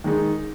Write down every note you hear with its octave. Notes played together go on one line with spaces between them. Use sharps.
D#3 G#3 D#4